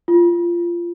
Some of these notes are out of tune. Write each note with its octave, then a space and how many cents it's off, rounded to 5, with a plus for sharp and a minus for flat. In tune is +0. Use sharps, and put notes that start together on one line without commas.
F4 -20